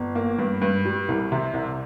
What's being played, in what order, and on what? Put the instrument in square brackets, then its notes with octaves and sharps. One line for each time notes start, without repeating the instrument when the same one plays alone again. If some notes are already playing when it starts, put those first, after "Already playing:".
Already playing: [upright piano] G1
A#3
G2
G2
G3
C2
C3
C2